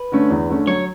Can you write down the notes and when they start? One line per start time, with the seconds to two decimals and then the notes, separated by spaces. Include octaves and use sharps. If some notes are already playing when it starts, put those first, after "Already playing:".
Already playing: B4
0.12 D3 A3 C#4
0.30 E2
0.49 D3 A3 C#4
0.67 F#3 C#5